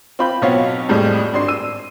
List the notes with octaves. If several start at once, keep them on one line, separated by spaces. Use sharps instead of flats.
C4 F4 B5 G6
B1 F#3 B3 C4 C#5 F5
F2 A2 G3 G#3
G#1 D4 C6 C7
E6 D#7